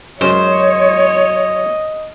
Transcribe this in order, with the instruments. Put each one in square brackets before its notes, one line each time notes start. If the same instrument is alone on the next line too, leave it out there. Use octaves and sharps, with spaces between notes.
[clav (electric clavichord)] F#2 G#3 C#4 [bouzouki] C5 [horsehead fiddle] C#5 [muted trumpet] D#5